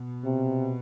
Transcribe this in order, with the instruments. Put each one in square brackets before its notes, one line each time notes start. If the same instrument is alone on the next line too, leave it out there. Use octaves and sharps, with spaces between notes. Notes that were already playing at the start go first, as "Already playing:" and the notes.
Already playing: [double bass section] B2
[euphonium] C3